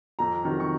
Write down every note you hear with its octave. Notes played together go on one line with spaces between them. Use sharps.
F2 A#5
C3 D#3 F#3
C#6